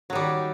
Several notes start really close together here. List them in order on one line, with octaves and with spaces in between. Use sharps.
F#3 D#3 G3